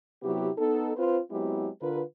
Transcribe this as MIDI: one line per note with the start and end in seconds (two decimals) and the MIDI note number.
0.23 0.49 48
0.23 0.49 54
0.23 0.49 59
0.23 0.49 64
0.23 0.49 67
0.57 0.92 59
0.57 0.92 63
0.57 0.92 69
0.96 1.17 60
0.96 1.17 65
0.96 1.17 71
0.96 1.17 72
1.30 1.68 54
1.30 1.68 56
1.30 1.68 59
1.30 1.68 60
1.30 1.68 64
1.30 1.68 67
1.80 2.00 50
1.80 2.00 65
1.80 2.00 70
1.80 2.00 71